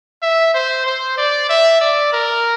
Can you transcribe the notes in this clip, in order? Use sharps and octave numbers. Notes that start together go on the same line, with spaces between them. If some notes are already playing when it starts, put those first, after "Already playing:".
E5
C5
C5
D5
E5
D5
A#4